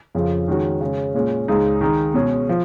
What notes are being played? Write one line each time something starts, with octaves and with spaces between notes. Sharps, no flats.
F2 C#3 F3
D#3 G#3 C#4 F#4
C#3 G#3 C#4
A#2 G#3 C#4
C#2 C#3 G#3 D#4
D#3 G#3 D#4
B2 G#3 C#4 G#4
F3